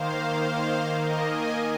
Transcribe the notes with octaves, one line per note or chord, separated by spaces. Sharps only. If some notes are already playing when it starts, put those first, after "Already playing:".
Already playing: D#3 A#3 C5 F5
A#4 D#5
D#5 G#5